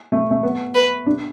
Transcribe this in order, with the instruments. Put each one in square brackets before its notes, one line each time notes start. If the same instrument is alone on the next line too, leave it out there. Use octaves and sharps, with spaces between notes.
[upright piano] A3
A3
B3
[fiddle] B4
[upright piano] D4